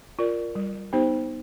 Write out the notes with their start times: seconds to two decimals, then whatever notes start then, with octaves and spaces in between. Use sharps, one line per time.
0.19 F4 A#4 D5
0.55 G3
0.93 B3 D#4 G4 C5